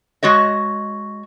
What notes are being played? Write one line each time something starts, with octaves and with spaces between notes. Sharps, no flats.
G#3 F#4 C#5 D#5